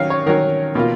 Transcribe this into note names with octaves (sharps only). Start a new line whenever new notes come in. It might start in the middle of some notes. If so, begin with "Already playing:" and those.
Already playing: D#3 F#3 C#4 F5
C#5
D#3 F#3 C#4 A#4
B2 A#3 F4